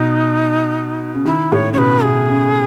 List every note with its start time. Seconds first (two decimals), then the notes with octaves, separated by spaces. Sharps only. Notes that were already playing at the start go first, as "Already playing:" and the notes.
Already playing: B2 D#4
1.15 C#3
1.25 D#3 E4
1.52 A2 C#5
1.73 C#3 C#5
1.77 B2 B4
2.03 B2 G#4
2.29 C#3